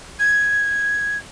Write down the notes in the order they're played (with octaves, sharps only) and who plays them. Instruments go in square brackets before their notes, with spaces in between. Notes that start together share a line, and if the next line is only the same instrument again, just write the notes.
[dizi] G#6